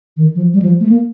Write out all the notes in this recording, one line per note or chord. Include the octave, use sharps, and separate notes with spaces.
D#3
F3
G3
F3
A3
A#3